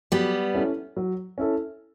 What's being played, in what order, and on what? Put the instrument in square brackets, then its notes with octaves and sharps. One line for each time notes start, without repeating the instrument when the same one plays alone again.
[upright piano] F#3 [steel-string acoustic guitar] G3 B3
[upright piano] C#4 E4 A4
F#3
C#4 E4 A4